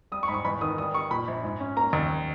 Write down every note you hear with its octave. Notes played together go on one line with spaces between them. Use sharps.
G3 D#6
C#6
G#2 B5
C#6
E2 B5
D#3 D#6
G3 D#6
G3 C#6
A#2 B5
A#1
G#2
C#4
A#3 A#5
D#2